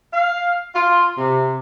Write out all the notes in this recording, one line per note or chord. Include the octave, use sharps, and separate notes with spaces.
F5
F4
C3